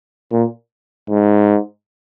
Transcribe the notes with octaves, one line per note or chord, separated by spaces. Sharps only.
A#2
G#2